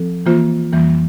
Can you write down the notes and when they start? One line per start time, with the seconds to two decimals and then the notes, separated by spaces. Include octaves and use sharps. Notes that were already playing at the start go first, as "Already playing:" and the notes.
Already playing: F3 C4 A4
0.26 E3 A#3 F4 C5
0.73 F2 E3 G3 A#3